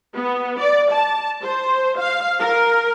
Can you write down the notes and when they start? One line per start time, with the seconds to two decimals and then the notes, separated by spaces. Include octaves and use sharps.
0.15 B3
0.59 D5
0.91 A5
1.42 C5
1.97 F5
2.40 A#4